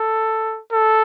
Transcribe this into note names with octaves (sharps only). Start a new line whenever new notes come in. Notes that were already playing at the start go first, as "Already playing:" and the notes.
Already playing: A4
A4